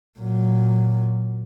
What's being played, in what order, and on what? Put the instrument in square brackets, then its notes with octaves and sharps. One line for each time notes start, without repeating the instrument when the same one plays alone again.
[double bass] A#2 F#3